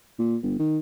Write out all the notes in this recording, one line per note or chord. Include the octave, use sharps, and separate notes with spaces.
A#2
G1
D#3